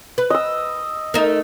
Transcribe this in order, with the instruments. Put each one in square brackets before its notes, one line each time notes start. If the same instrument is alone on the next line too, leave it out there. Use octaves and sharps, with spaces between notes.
[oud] B4
[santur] D#5 E6
[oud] A3 D#4 A#4